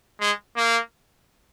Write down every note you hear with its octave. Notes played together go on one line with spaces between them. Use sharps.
G#3
A#3